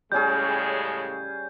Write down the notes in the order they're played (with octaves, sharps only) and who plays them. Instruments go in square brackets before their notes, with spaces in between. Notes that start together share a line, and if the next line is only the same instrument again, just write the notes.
[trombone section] A2 C#3 G#3 [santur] G3 C#4 G#4 [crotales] G6